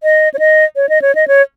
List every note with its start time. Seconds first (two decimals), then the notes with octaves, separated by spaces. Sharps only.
0.03 D#5
0.34 C#5
0.39 D#5
0.76 C#5
0.89 D#5
1.02 C#5
1.15 D#5
1.28 C#5